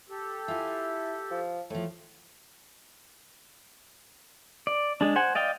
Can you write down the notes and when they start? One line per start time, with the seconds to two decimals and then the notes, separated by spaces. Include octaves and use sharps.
0.09 G4 A4
0.48 E4 F4 G#5
1.31 F3
1.70 A2 F3 A3
4.67 D5
5.01 G#3 D4
5.16 C5 F#5 G#5
5.35 D5 D#5 F5 G5